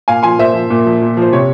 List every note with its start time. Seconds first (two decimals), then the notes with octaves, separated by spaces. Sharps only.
0.08 A#2 F5 G#5
0.23 F3 G#5 C6
0.39 A#2 C5 E5
0.54 F3
0.70 A#2
0.86 F3
1.01 A#2
1.17 F3 C5
1.33 C3 C#5